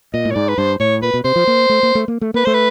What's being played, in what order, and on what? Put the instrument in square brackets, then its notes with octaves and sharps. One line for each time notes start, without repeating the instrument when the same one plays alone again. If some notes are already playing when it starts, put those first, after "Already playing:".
[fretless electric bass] A#2 [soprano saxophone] D#5
[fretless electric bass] A2
[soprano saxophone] C#5
[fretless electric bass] G#2 [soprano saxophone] D5
[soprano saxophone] B4
[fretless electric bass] G2 [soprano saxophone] C5
[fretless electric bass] A2 [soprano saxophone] C#5
[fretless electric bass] A#2 [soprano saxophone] B4
[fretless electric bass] B2
[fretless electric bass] C3 [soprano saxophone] C5
[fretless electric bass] F3
A#3
A3
A#3
A3
A#3
A3
[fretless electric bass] A#3 [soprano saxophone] B4
[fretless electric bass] A3 [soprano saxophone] C5
[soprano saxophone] B4